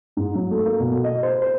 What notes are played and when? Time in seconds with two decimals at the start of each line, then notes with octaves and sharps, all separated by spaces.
0.17 G#2
0.35 F#3
0.51 A3
0.64 A#3
0.80 B2
1.04 D#5
1.23 C5
1.42 C5